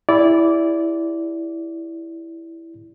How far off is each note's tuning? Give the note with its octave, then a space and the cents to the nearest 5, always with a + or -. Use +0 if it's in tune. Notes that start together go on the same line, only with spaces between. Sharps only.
E4 +0 G4 +40 D5 -15